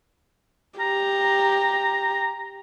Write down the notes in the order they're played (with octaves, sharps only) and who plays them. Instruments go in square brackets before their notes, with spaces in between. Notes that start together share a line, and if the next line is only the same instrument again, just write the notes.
[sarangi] G4 [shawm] A#5